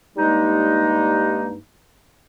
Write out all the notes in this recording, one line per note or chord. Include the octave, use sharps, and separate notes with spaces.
G2 G3 G#3 A#3 D#4